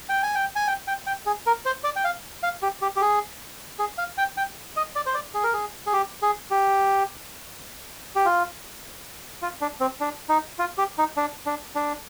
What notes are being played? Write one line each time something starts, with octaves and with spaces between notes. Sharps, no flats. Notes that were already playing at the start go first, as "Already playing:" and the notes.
G5
G#5
G5
G#5
G5
G5
G5
G#4
A#4
C5
D5
G5
F5
F5
G4
G4
G4
G#4
G#4
F5
G5
G5
D#5
D5
C5
D5
G#4
A#4
G#4
G#4
G4
G#4
G4
G4
F4
F4
D4
C4
D4
D#4
F4
G4
D#4
D4
D4
D4